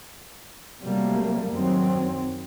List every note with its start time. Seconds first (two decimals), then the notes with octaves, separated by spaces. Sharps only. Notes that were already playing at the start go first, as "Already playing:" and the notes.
0.82 C3 F#3 G3 A3 A#3
1.51 F#2 D#3 F#3 C4